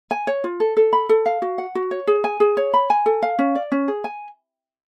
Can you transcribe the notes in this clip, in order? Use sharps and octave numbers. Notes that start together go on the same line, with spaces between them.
G#5
C#5
F4
A4
A4
B5
A4
F5
F#4
F#5
F#4
C#5
G#4
G#5
G#4
C#5
B5
G#5
A4
F5
C#4
D5
C#4
G#4
G#5